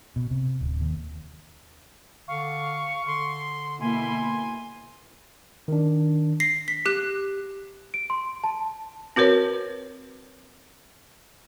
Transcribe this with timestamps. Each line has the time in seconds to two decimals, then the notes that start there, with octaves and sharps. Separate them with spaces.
0.16 B2
0.31 C3
0.61 D1
0.81 D#2
2.28 D3 F5 C#6
3.06 D3 C6
3.81 B2 A#3 E4 G#5 C6
5.68 D#3 D4
6.40 A#6 C7
6.68 B6
6.86 G4 F#6
7.94 D7
8.10 C6
8.44 A5
9.16 C4 F#4 A#4 B4 C#5